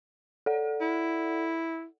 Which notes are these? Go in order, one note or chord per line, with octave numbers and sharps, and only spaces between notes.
A4 D5 F#5
E4